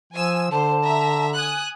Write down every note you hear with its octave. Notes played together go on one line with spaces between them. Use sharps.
F3 G#5 E6
D3 C5 A5
E5 A#5
G#5 D#6 F#6